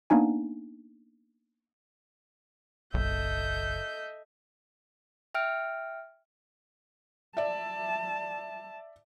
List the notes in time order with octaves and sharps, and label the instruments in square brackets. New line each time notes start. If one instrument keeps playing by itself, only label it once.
[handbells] A#3 B3 D4 D#4 G#5
[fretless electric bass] F#1 [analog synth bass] B1 [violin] A4 G6 [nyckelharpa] D#5 E5
[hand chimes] E5 G5 F6 D7
[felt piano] D5 E5 [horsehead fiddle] A5